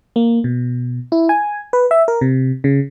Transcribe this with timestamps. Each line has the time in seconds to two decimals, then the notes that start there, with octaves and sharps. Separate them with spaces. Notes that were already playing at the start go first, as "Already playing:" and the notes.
0.16 A#3
0.44 B2
1.12 E4
1.29 G#5
1.73 B4
1.91 E5
2.08 A#4
2.21 C3
2.64 C#3